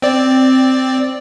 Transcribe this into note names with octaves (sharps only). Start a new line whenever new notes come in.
C4 D5